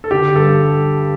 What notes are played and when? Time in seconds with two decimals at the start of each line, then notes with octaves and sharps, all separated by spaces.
0.04 A4
0.11 D3 G4
0.36 G2 A4